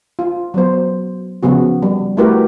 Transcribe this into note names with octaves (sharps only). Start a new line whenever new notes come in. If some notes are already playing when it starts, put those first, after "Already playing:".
F4
F#3 B3 C5
C#3 F3 B3 F#4
G3
A3 E4 F#4 G4 A#4 B4